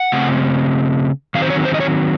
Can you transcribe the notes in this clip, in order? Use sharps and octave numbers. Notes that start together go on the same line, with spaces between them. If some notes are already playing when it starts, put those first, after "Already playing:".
Already playing: F#5
C#3 A3 C4
D#3 F#3 C4 D#4 F5
C5
C#5
C5
D#5
C#5